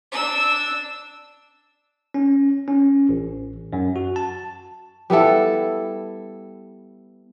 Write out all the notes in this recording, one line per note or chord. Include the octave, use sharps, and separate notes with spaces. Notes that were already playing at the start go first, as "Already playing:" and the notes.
D4 E6
C#4
C#4
A1
F#2
F#4
A5
G3 B3 E4 A4